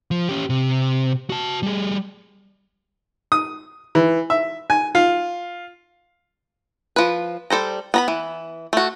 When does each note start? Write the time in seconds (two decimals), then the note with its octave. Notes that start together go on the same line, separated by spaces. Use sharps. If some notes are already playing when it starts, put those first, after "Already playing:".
0.11 F3
0.29 C#4 G4
0.50 C3
1.30 F#4 A5
1.63 G3 G#4
3.32 D#6
3.95 E3
4.30 E5
4.70 G#5
4.95 F4
6.96 F3 B4
7.50 G3 A4 C5 A#5
7.94 B3 A#5 B5
8.08 E3
8.73 A3 F#4